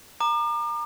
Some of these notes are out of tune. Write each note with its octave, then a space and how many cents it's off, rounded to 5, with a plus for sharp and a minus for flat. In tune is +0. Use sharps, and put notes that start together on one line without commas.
A#5 +0 D6 +40